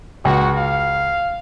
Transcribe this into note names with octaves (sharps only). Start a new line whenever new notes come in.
C#2 F#4
F5